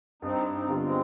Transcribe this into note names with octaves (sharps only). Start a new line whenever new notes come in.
G2 C4 D#4
C4 D#4
D3 G3 B3 F4
G#3 C4